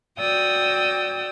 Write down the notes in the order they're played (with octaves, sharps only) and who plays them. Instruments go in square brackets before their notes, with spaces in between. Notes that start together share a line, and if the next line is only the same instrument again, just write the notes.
[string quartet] F#4 D5 G5 D#6 E6